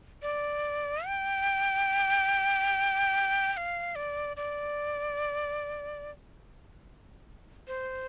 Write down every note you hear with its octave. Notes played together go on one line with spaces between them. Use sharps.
D5
G5
G5
F5
D5
D5
C5